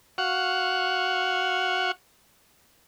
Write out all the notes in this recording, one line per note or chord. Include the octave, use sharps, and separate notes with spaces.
F#4 F5 F#5 C#6